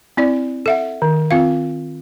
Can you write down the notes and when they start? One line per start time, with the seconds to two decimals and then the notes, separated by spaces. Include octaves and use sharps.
0.17 C4 E4 D5
0.66 A4 E5 F#5
1.02 D#3
1.31 C4 F4 F5